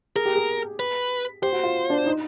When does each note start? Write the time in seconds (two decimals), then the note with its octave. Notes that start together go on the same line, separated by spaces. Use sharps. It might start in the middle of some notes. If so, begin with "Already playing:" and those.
0.16 G#4 A#4
0.25 G4
0.35 G#4
0.80 B4
1.42 G4 C5
1.53 F#4
1.63 F4
1.90 D4
2.06 D#4